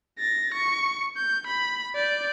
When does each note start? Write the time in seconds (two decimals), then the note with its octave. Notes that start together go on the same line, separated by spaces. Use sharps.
0.19 A6 A#6
0.54 C#6
1.17 G6
1.47 B5
1.96 D5 G6